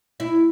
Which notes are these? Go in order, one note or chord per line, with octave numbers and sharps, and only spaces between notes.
E4